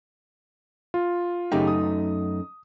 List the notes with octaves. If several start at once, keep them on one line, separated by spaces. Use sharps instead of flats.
F4
F#2 C#3 A3 D#4 G4 G5
D#6